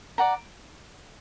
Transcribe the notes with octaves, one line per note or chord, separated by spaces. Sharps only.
D5 F#5 A#5